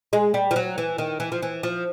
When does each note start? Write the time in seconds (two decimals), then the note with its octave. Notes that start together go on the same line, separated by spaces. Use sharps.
0.13 G#3
0.34 G3
0.51 F3
0.56 F#3
0.78 E3
0.98 D#3
1.20 E3
1.32 F3
1.42 E3
1.63 F3